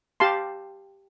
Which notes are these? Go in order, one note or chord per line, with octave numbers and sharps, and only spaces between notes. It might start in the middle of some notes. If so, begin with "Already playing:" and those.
G4 F5 A5 C6